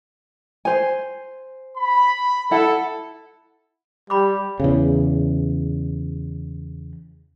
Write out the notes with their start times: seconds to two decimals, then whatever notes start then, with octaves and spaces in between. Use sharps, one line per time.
0.65 C5 G#5
1.77 B5
2.51 E4 A4 F#5
4.10 G3 G4 B5 D6
4.60 E2 C#3